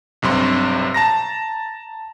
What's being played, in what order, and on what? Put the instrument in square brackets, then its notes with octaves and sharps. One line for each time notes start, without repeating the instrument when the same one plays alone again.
[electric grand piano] B1 G2 C3 C6
A5 A#5 A#6